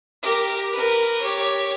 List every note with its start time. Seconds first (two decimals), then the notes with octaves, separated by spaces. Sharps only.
0.22 G4 A#4
0.72 A#4 B4
1.21 G4 C#5